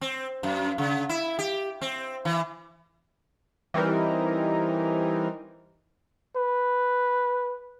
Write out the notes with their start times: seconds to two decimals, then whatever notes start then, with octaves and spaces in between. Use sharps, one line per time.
0.01 C4
0.43 F#2
0.78 C#3
1.09 E4
1.39 G4
1.81 C4
2.25 E3
3.74 E3 G3 C4 D#4 A#4
6.37 B4